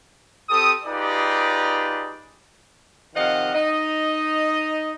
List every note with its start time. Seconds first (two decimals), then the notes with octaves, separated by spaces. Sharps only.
0.49 C4 G4 A4 D#6
0.85 D#4 F4 G4 G#4 B4 D5
3.15 C3 D#3 F3 D#5 F5 F#5
3.54 D#4 D#5